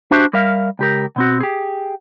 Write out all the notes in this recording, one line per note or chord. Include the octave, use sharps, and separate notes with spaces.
D4 F#4 G4 C5 E5
G3 A#4 E5 F5
C#2 G4 A#4
B2 C4 F#4
G4 G#4